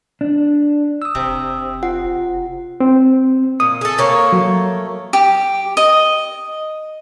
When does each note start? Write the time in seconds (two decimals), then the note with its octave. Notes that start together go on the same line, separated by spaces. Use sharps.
0.21 D4
1.02 D#6 E6
1.15 F1 C3
1.83 F4 F#5
2.80 C4
3.60 A#2 D#6
3.81 G#4 A4
3.98 A3 A#3 C#5
4.32 F#3
5.13 G4
5.77 D#5